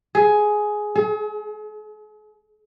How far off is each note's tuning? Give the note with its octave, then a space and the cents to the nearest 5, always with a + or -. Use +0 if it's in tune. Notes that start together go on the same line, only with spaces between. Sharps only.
G#4 +10
G#4 +45